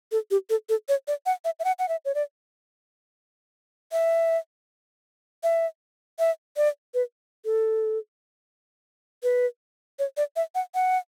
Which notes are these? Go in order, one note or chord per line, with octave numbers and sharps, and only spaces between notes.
A4
G4
A4
A4
C#5
D5
F#5
E5
E5
F#5
F#5
E5
C#5
D5
E5
E5
E5
D5
B4
A4
B4
C#5
D5
E5
F#5
F#5